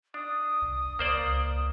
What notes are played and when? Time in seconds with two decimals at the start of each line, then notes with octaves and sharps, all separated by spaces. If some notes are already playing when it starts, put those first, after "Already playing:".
0.14 D4 D#6
0.62 C2
0.99 C#2 A#3 C5 D5